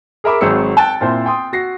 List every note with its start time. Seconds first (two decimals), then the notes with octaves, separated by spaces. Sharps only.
0.24 G#4 A#4 E5 B5 D6
0.41 G#1 F#3 C4 G#4 E6 C#7
0.77 G5 A5 F#6 A6
1.01 A#2 C4 E4 C5 C6
1.26 G5 C6 D#6
1.53 F#4 A#6 C7